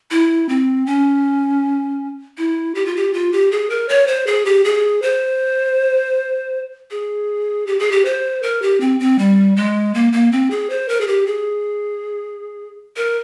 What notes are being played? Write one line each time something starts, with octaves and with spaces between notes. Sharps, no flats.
E4
C4
C#4
E4
G4
F4
G4
F4
G4
G#4
A#4
C#5
C5
G#4
G4
G#4
C5
G#4
G4
G#4
G4
C5
A#4
G4
C4
C4
G3
G#3
A#3
A#3
C4
G#4
C5
A#4
G#4
G4
G#4
A#4